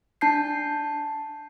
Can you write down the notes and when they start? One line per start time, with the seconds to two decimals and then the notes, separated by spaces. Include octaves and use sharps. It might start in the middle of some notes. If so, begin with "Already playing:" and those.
0.21 D4 A5 G6 C7